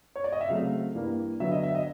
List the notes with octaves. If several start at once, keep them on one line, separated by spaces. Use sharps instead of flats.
C#5
D5
D#5
E5
C#3 F#3 A3 C4 F5
G2 E3 G3 A#3
D3 F#3 B3 E5
D#5
E5
D#5